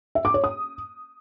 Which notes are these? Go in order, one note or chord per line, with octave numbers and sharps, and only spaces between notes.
E5
D6
C#5
D#6